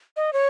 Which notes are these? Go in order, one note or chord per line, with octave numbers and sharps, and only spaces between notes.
D#5
C#5